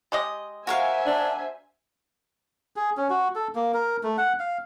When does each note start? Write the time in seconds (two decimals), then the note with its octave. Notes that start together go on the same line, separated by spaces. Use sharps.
0.12 G#3 G4 D#5
0.67 F#4 A#4 C5 E5 F5 G#5
1.06 D4
2.76 G#4
2.97 C#4
3.10 F#4
3.35 A4
3.55 A#3
3.74 A#4
4.03 A3
4.17 F#5
4.40 F5